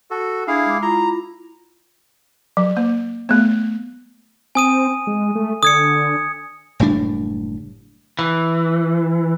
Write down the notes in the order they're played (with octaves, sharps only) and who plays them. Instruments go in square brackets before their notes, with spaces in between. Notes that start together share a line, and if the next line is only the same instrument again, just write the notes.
[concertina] F#4 A4
[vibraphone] D4 [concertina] E4 G#4 F5
[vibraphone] G#3 D6
[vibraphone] E4 F4 B5 [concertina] A#5
[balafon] F#3
A#3
A3 B3
[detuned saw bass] C4 [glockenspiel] G#5 D#6 D#7
[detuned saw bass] G#3
A3
[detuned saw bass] D3 [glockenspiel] D#6 G#6 C#7
[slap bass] F#1 A2 G3 D4
[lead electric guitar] E3